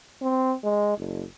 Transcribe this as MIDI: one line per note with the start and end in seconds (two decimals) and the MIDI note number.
0.22 0.54 60
0.64 0.95 56
0.98 1.24 30